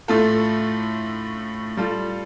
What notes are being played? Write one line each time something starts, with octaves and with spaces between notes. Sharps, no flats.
A2 A3 F4 A4
G3 F4 A4